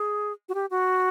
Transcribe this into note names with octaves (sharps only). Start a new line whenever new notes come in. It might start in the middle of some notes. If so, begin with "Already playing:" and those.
Already playing: G#4
F#4
G4
F#4